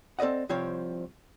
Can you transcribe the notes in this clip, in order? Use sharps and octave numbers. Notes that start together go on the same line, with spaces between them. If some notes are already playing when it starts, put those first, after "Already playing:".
C4 A4 D5 D#5 F#5
C2 F3 C4 F4 C#5